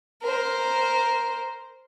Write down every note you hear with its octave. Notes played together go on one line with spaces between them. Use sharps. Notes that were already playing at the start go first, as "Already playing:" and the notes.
A#4 C5